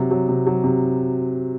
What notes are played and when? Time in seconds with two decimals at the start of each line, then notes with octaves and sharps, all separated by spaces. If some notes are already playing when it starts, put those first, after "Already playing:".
Already playing: C3 F#3
0.11 F#3
0.29 C3
0.47 F#3
0.64 C3